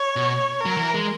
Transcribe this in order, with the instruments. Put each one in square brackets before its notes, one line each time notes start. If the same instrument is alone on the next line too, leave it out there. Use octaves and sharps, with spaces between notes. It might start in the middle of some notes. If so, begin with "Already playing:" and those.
Already playing: [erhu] C#5
[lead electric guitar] B2
[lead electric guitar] F#3 [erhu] A#4
[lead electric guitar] E3
G#3